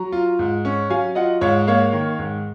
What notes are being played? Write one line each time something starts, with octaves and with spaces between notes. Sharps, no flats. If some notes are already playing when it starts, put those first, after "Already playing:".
Already playing: F#3 A#5
F4
G#2
C#4
F#3 F5 G#5
F4 D#5 F#5
G#2 C#5 F5
A#3 C#5 F5
D#3
G#2